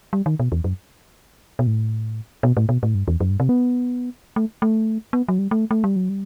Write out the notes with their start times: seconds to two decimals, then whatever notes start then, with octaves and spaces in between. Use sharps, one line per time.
0.13 G3
0.26 D#3
0.40 B2
0.52 E2
0.64 F#2
1.59 B2
1.67 A2
2.43 B2
2.57 A2
2.69 B2
2.83 A2
2.95 G2
3.08 E2
3.20 F#2
3.30 G2
3.40 C3
3.49 B3
4.36 A3
4.62 A3
5.13 B3
5.28 F#3
5.39 G3
5.51 A3
5.71 A3
5.84 G3
5.96 F#3
6.09 G3